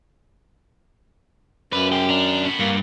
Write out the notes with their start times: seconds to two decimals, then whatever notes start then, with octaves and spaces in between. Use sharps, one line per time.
1.73 F#2 B4 D5 F5
1.92 C3 G#3 G4
2.10 D#3 D4 A#5
2.44 A2 B3
2.60 G2 A#3